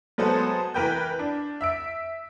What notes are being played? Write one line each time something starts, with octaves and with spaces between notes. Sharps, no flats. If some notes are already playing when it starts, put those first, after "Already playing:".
F#3 G#3 B3 A4 C5
E3 A#4 B4 G5 G6
D4
E5 E6 D7